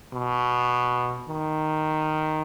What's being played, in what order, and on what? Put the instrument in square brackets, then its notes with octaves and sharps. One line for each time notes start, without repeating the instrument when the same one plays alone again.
[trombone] B2
D#3